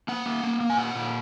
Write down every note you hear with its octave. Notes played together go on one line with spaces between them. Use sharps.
A#3 F#5
A#3
A#3
A#3
G#5
A#2 F#5
A#2